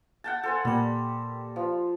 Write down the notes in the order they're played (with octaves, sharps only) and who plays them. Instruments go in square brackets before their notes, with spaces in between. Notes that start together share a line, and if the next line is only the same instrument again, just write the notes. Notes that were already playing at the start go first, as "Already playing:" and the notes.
[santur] F#5 G5 A5
A4 C5 G#5
[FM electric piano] A#2 A#3 G5 [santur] G3
[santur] F3